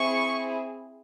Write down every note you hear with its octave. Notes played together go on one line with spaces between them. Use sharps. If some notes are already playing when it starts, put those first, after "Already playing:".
Already playing: C4 E4 G#4 C#6